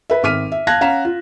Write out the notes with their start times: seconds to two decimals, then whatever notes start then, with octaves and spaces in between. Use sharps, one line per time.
0.10 B4 E5
0.23 G#1 E5 D6 F6 B6 D#7
0.52 E5
0.67 F5 A5 F#6 G#6 A#6
0.81 C#4 F5 F#5 A#5 B6 E7
1.05 F4